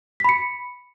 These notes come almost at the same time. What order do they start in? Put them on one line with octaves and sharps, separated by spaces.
B6 B5 C#7